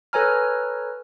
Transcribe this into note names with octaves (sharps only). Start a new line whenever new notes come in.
A4 B4 C#5 G#5 A#5 F6